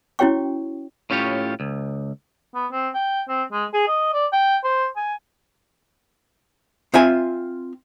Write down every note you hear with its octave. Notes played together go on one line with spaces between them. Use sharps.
C#4 E4 F#4 C#5 G5 C#6
A2 C#4 F4 G4 C#5
C#2
B3
C4
G5
C4
G#3
G#4
D#5
D5
G5
C5
G#5
C4 F4 E5 G#5